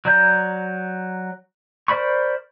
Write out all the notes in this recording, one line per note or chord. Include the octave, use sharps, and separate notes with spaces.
F#3 D5 A#5 G6
A#4 C5 D5 B5 C#6